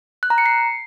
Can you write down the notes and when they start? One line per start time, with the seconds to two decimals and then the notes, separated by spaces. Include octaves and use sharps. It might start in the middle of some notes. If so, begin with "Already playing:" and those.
0.23 F#6
0.30 A#5
0.38 C#7
0.46 C7